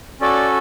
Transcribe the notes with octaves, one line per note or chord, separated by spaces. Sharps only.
C#4 F#4 A4 D5